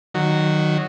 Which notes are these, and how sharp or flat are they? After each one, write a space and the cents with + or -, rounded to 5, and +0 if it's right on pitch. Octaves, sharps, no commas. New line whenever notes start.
D#3 -20 F#3 +0